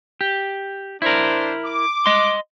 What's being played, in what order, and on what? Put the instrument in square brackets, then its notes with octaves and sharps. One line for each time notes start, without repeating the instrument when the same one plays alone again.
[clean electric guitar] G4
[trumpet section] D4 C5 [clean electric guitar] E4 A#4
[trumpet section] D6
[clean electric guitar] D#5 C6